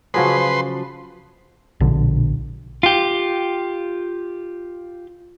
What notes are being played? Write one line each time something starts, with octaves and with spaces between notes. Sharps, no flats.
C#3 F3 F#3 F#4 G#4 B4 D5 C6
A#1 B2 D3
F4 G4